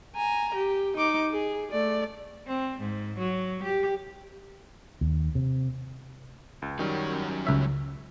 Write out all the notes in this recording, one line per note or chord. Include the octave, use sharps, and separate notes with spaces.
G#5 A#5
G4
D#4 D6
G#4
A3 D5
C4
G#2
F#3
G4
D#2
C3
C#2
D#3 F#3 G3 C#4
C#2 E5